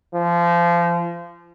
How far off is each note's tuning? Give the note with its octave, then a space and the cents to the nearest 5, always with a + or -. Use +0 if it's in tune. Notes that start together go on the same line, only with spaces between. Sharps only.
F3 -25